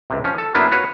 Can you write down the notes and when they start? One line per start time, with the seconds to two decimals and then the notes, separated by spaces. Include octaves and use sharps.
0.10 C#2 C3
0.24 F3 C#4
0.38 A4
0.55 F#2 A#3 B3 D4 E4 F4
0.71 F4 F#4 B4 C#5